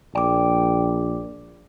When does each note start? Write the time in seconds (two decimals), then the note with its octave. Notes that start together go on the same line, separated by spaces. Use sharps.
0.15 A#1 D5 G5 D6